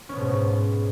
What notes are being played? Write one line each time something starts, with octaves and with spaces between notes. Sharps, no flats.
G#2 B2 B3 C#4